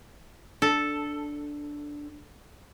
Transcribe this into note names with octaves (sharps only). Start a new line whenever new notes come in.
D4 A4